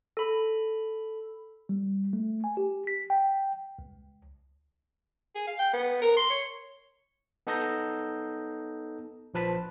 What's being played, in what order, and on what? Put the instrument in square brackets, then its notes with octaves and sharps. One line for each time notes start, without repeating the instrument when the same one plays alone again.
[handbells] A4 B5
[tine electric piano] G3
A3
G#5
G4
B6
G5
C#2
[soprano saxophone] G#4
F5
G5
B3
A#4
C6
C#5
[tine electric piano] B3 D#4 A4 D#6 G6 A#6
A#1 F3 B4 A5 B6